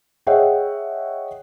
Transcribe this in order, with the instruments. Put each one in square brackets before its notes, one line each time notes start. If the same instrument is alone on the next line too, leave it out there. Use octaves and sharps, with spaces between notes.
[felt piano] G#4 C#5 D#5 E5 F#5 G5